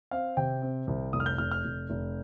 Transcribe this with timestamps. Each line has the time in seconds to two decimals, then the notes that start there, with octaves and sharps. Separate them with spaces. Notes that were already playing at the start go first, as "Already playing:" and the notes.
0.11 C4 F5
0.37 C3 G5
0.62 C4
0.87 C2
1.13 F1 D#6
1.20 F6
1.26 G6
1.38 F1 F6
1.51 F6
1.64 F1
1.90 F1